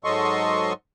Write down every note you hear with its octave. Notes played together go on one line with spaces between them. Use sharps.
G#2 F#3 A4 D#5 C6 C#6